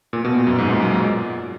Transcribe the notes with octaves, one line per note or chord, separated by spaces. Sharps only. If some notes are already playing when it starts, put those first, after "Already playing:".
A#2
B2
A#2
F#2
G#2
A#2
F#3
G#3